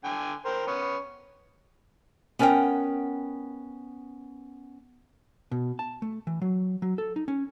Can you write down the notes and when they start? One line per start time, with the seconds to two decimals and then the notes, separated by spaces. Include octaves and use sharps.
0.04 D3 G5 G#5
0.45 A#4 C5 G5
0.67 B3 C#4
2.39 B3 C#4 A#4 C#5 F#5 G5
5.51 B2
5.79 A5
6.02 A3
6.27 E3
6.42 F#3
6.82 F#3
6.98 A4
7.16 D#4
7.28 C#4